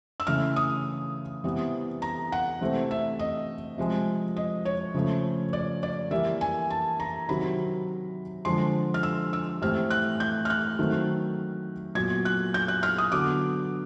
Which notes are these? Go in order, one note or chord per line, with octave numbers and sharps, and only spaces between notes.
E6
C#3 E3 A3 F6
D#6
C3 E3 G3 B3
A#5
F#5
C3 E3 A3 C4
E5
D#5
C3 F3 G#3
D#5
C#5
C#3 F3 A3
D5
D5
E3 G3 A#3 E5
G#5
A5
A#5
C3 D#3 F#3 B5
D3 F3 G#3 C6
F6
E6
E6
A2 E3 G3 C4 F6
F#6
G6
F6
F#6
D#3 F#3 A3 C4
A#2 F#3 B3 G#6
F#6
G6
F#6
F6
D#6
D3 F#3 B3 D6